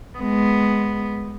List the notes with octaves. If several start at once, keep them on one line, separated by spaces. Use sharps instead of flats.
G#3 B3